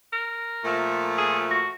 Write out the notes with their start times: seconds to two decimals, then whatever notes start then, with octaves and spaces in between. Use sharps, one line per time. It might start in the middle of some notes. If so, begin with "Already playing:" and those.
0.13 A#4
0.64 A#2 F3 A3
1.18 G#4
1.51 F#4